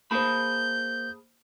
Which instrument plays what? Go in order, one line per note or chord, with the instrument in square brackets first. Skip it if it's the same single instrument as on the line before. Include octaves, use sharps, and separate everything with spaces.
[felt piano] A#3 C5 [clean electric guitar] G#4 A5 B5 [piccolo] G6